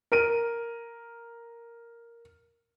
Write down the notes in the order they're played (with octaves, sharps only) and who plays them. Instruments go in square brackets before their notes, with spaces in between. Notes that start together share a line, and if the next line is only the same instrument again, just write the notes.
[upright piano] A#4 D7 D#7